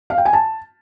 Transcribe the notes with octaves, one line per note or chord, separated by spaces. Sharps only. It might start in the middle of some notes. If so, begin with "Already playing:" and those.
F5
G5
G#5
A5